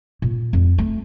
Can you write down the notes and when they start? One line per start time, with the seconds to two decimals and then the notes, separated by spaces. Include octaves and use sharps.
0.22 A#2
0.53 F2
0.78 A3